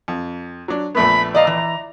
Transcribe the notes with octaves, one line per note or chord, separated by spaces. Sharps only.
F2
F#3 D4
A#1 A3 B3 B5
D5 D#5 F5 A#5
E3